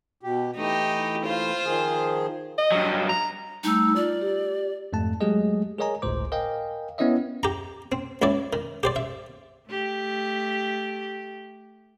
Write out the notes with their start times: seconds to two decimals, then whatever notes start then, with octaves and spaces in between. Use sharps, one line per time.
0.23 B2 G4
0.57 E3 A3 D#4 G4
1.26 F4 C5
1.65 D#3 F3 G#4
2.58 D#5
2.72 G2 F#3
3.09 A#5
3.63 G3 A3 D#4 E6
3.96 F4 D5
4.21 G4
4.93 F2 G#2 A3 A5
5.21 F#3 G#3 A3 G4 G#4 D#5
5.78 G#4 A#4 C#5 D#5 G#5 A#5
6.02 G1 C#2 A2 C5 D6
6.32 A#4 D#5 F5 G5 G#5
6.98 B3 C#4 E4 C#5 D#5 E5
7.43 G4 A#5
7.92 C4
8.22 C#2 E4 C#5 D5
8.53 D#3
8.83 G4 C5 D5
8.96 E5
9.69 A3 G4